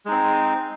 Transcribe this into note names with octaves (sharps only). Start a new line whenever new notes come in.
G#3 C4 D#4